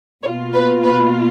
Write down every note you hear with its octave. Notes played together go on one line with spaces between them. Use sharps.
B2 A#3 F4 C#5
B4
B4